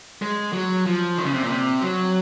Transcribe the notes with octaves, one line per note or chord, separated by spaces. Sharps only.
G#3
F#3
F3
D#3
C#3
C3
A#2
C3
F#3